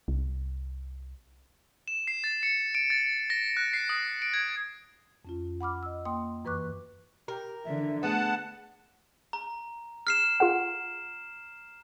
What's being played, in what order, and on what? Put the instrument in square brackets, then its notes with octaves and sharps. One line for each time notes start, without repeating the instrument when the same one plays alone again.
[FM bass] C2
[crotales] E7
C7
A6
C#7
D7
A6
A#6
F#6
C7
D#6
D7
G#6
[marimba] F2 C#4 F4
F#5 B5 D6 F6
D#5 E6
A#3 G5 C6 D#6
F#2 E3 B4 C#6 D6 F#6
[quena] G4 [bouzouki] A#4
[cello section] D3 E3 [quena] E5
[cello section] A3 [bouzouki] B3 [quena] G#4 [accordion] F#5 A5
[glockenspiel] A#5
F6 C7 E7
[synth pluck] F4 G#4 F#5